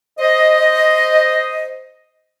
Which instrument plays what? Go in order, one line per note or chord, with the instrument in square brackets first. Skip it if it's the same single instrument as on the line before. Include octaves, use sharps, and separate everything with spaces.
[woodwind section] C5 D#5